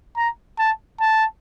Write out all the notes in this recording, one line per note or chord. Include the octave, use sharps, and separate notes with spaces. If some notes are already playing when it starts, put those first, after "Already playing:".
A#5
A5
A5